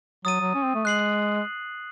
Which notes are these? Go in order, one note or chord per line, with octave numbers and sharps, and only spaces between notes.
F#3 D#6 A6 D#7
F#3
C#4
C4
A3
G#3 F#6 C7 F#7